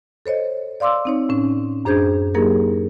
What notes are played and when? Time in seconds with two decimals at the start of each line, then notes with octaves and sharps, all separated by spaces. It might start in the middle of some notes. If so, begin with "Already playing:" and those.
0.26 A4 C5 C#5 D#5
0.80 D5 F5 C6 D6 E6
1.05 C4 D#4 C#5
1.29 A2 C#4
1.85 F#2 D4 G#4 C5 G6 G#6
2.34 F#3 A#3 D#4 G4 G#4 A#4